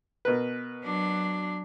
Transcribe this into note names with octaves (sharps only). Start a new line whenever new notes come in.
B2 A#4 B4
F#3 D4